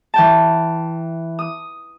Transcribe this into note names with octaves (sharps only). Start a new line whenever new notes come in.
E3 G5 A5
D#6